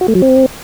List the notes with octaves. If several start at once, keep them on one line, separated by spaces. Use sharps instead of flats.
F#4
A3
F#3
C4